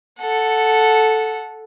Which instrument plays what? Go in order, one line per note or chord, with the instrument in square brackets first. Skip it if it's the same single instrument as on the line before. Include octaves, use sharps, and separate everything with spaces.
[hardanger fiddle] A4 F#5